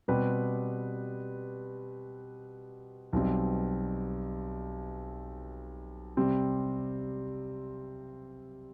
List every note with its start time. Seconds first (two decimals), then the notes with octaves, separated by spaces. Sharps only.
0.08 B2 G3 C4 G4 B4
3.13 B1 B2 G3 C4
6.17 C3 G3 C4